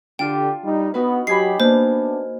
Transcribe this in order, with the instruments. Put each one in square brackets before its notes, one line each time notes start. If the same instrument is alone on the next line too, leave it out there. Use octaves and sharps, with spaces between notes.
[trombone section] D3 G4 [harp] D4 F4 [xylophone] G5
[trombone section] G3 D#4
[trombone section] B3 [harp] D#4 F#4 B4
[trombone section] F#3 G4 [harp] D#5 G#5 B5 [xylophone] C7
[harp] A#3 [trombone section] B3 D4 [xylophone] C5